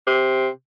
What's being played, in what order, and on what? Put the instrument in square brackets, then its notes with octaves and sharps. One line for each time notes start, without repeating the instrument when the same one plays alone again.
[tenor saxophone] C3